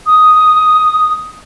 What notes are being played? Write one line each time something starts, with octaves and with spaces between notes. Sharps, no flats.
D#6